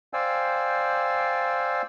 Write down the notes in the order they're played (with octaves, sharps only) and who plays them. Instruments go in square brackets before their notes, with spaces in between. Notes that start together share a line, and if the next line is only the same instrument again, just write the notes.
[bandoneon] C5 D5 F5 G5 G#5 E6